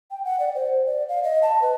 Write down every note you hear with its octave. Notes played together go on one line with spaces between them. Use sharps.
G5
F#5
D5
C5
D5
F5
D#5
A5
B4